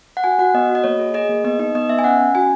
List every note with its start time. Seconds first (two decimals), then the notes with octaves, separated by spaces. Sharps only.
0.17 F#5
0.24 F#4 G#5
0.39 F#4 F#5
0.54 B3 D#5
0.69 F#4
0.75 D#5
0.84 A#3 C#5
0.99 G#4
1.14 G#4 D#5
1.29 A#3
1.45 B3 D#5
1.59 D#4 D#5
1.75 B3 D#5
1.89 B3 E5
1.99 G#5
2.04 C#4 F#5
2.20 C#4
2.35 F#4 G#5